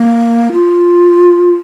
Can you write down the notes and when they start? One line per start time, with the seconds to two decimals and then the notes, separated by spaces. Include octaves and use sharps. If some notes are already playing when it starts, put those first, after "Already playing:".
Already playing: A#3
0.52 F4